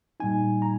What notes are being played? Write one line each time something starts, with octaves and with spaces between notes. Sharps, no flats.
A#2 G3 A#3 D#4 G#5
A#5